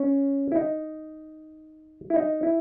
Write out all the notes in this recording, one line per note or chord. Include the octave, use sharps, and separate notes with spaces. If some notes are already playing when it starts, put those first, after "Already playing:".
Already playing: C#4
E4
D#4
E4
D#4
E4